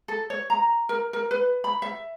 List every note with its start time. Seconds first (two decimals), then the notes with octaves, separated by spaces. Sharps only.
0.08 A4
0.30 C#5
0.50 A#5
0.89 A#4
1.13 A#4
1.31 B4
1.64 B5
1.82 E5